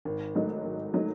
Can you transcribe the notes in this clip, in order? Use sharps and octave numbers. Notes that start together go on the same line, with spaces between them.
G#1
G#2 F#3 A3 D#4
G#1
F#3 A3 D#4